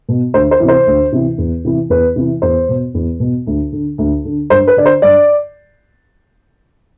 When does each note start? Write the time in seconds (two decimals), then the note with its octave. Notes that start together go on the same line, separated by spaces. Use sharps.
0.09 B2
0.34 D2 C5
0.51 C5
0.60 C3 E3
0.68 C5
0.87 D2
1.12 C3 E3
1.38 E2
1.65 C3 E3
1.90 E2 B4
2.16 C3 E3
2.42 E2 C5
2.69 B2
2.94 E2
3.20 B2
3.47 D2
3.72 D3
3.98 D2
4.25 D3
4.50 G2 C5
4.67 B4
4.77 D3 D5
4.86 C5
5.02 G2 D5